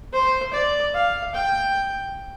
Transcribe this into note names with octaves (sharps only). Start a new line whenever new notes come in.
C5
D5
F5
G5